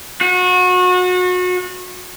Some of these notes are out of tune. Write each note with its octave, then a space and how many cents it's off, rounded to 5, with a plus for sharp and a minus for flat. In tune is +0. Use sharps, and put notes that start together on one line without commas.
F#4 -30